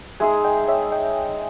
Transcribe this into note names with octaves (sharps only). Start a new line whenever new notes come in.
G#3 D#4 G#4 E5 G#5
D#5 G5
C#5 E5
D#5 G5